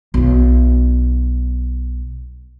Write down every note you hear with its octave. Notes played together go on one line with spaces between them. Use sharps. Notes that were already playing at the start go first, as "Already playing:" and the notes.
B1 E4